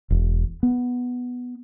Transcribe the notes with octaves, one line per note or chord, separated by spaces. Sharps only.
E1
B3